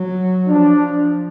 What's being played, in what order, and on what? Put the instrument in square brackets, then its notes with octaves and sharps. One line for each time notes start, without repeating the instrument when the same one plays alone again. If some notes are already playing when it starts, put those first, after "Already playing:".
Already playing: [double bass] F#3
[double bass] F3 [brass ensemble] D4